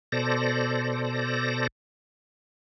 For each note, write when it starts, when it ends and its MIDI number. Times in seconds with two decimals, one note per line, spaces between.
0.12 1.67 47
0.12 1.67 69
0.12 1.67 72
0.12 1.67 74
0.12 1.67 94